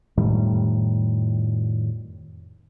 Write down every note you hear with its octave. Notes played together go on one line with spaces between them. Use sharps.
F2 A2 D#3 G3